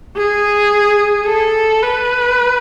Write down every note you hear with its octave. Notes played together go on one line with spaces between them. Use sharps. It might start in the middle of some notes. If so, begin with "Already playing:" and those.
G#4
A4
B4